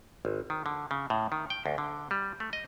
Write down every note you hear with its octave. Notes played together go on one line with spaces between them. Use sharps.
G#1
D#3
D3
C#3
A2
D#3
G5
D2
D3
G3
A3
D#5